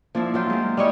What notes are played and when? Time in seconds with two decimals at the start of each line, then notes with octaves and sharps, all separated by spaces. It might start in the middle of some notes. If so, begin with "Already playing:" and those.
0.15 F3 A#3 D4 E4
0.34 F#3 F4 G5
0.50 G#3 A#3
0.77 G3 E4 C#5 D#5 F#5